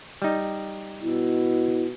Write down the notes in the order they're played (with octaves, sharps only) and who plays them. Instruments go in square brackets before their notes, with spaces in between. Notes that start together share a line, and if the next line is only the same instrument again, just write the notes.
[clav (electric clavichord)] G3 D#4
[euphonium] B2 [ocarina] E4